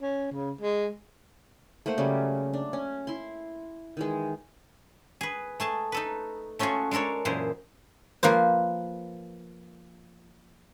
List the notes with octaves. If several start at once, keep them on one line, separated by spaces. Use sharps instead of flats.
C#4
C#3
G#3
A3 A#3 C5 F#5
C#3 F#3 G3 C#4
D4
C#4
E4 C6
D#3 E3 G#3
G#4 B4
A3 G#4 A5
D#4 A4 B4
A3 C#4 F4 F#4 G#4
G#3 D4 A4 A#4 C#5
F#2 A#2 E3 G#4 C5
F3 A#3 B4 C5